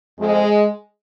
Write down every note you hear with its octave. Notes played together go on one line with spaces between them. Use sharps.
F2 F3 G#3